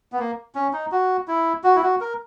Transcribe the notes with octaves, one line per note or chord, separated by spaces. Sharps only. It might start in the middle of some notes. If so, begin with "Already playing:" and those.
B3
A#3
C#4
D#4
F#4
E4
F#4
E4
F#4
A#4